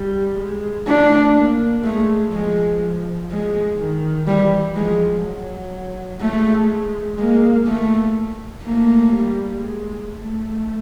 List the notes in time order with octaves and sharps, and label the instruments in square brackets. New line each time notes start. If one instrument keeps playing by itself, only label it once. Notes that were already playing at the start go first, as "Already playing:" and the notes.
Already playing: [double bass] G3
G#3
[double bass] A3 [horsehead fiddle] D4
[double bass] A#3
[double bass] G#3 [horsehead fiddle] A3
[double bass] F3 [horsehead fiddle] G#3
[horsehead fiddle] G#3
[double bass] D#3
[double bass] E3 [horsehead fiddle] G3
[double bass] F3 [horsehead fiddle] G#3
[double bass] F#3
[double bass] G#3 [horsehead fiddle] A3
[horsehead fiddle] G#3 [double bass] A#3
[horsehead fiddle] A3
[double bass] A3 [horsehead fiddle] A#3
[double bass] G3
G#3
A3